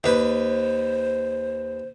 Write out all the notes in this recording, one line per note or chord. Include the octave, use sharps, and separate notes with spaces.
D#2 B4 C5